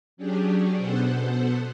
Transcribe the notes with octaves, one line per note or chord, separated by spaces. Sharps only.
F#3 C#4 D4 G4 G#4
B2 B3 A4 C5 F#5